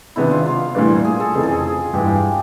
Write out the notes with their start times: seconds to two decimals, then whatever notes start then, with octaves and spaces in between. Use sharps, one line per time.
0.16 C3 D#3 G#3 B3 D4 E4
0.31 F4
0.46 F4
0.75 A2 E3 G3 A#3 D4
1.05 G#4
1.20 A4
1.35 F2 C#3 E3 A3 C4 G#4
1.43 A4
1.51 G#4
1.94 G2 E3 G#3 G4